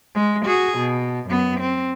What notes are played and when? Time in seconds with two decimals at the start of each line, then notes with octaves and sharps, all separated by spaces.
0.15 G#3
0.45 F#4 G#4
0.78 B2
1.27 F#2 B3
1.60 C4